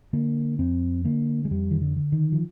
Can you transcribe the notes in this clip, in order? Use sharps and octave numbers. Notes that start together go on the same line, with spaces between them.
D3 A#3
F2 C4
D3 A#3
G#3
F2 G3
D#3
D3
D3
D#3
F3